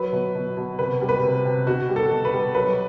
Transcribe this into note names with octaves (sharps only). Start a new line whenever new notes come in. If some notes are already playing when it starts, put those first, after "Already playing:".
Already playing: F#3 B4
B2
B2
B2
C3 B4
G3
B4
C3
C3
B2 F#4
G3
A4
B2
B4
G3
F#3 B4